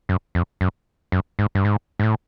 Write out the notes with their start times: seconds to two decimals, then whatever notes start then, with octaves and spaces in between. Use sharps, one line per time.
0.09 F#2
0.35 F2
0.61 F#2
1.12 F#2
1.39 G#2
1.55 G2
1.65 G#2
2.00 G#2
2.03 A2